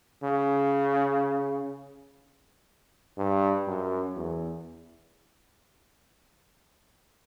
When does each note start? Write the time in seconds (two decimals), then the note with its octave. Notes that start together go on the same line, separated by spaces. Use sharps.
0.24 C#3
3.18 G2
3.68 F#2
4.16 E2